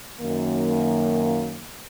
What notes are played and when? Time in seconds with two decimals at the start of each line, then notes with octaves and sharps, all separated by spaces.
0.21 F#2 D#3 A#3